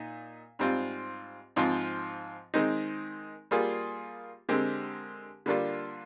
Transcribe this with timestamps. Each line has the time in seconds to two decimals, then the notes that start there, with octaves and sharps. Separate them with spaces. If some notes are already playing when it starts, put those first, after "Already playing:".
Already playing: A#2 D#4
0.59 G#2 G3 C4 F4
1.56 G#2 F3 C4 F4
2.54 D#3 G#3 C4 D#4
3.51 G3 A#3 F4 G#4
4.49 D3 G#3 C4 G4 A#4
5.46 D3 G3 A#3 D4 F4